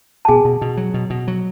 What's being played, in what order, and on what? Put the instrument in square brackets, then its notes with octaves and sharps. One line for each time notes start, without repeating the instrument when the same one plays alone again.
[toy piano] A5
[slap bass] B2 [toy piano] G#4 G#5
[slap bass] B2
B2
F#3
B2
B2
F#3